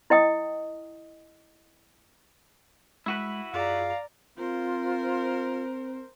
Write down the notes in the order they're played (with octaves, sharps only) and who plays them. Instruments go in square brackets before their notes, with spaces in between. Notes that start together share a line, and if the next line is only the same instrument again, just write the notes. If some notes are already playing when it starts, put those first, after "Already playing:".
[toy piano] E4 D#5 G5 D#6
[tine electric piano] G#3 [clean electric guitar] E4 F#4 B4
[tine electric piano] F#2 F4 G#4 [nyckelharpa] D5 A#5 [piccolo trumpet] F5
[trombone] C4 [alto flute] F4 [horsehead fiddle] A#4 C5